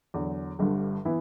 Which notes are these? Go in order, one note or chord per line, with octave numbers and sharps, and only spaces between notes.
E2 D3 F#3
G1 G2 D3 G3
E3 B3 E4